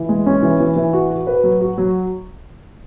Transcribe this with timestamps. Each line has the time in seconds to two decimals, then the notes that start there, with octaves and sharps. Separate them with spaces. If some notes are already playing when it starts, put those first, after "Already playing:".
Already playing: E3
0.09 G#3
0.26 C#4
0.43 E3
0.60 E3
0.76 E3
0.93 F#4
1.10 F#4
1.27 B4
1.44 F#3
1.61 F#4
1.78 F#3